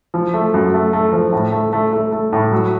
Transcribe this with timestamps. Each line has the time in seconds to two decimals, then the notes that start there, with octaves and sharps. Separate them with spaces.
0.14 F3
0.34 A3
0.54 F#2
0.74 A3
0.93 A3
1.13 F3
1.32 A2
1.52 A3
1.73 A3
1.93 A3
2.12 A3
2.33 A2
2.52 F#3